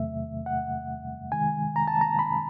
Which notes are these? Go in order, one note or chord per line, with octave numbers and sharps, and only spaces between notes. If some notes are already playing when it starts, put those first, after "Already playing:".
Already playing: E2 C3 D#3 F#3 A3 E5
F#5
C3 D#3 G#3 G#5
A#5
A5
A#5
B5